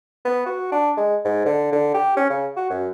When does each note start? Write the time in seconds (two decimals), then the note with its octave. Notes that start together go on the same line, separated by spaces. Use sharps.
0.25 B3
0.46 F#4
0.72 D4
0.97 G#3
1.25 G#2
1.46 D3
1.72 D3
1.94 G4
2.17 C#4
2.30 C#3
2.56 F#4
2.70 F#2